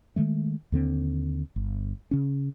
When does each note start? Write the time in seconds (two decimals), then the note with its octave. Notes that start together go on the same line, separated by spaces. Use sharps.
0.16 D#3 G#3 A3
0.72 D#2 D3 C4
1.56 G1
2.11 C#3 C#4